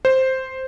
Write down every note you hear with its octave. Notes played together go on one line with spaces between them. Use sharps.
C5